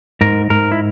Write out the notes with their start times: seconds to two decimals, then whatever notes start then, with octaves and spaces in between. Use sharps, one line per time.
0.21 G#2 A#4
0.50 G#2 A#4
0.72 E4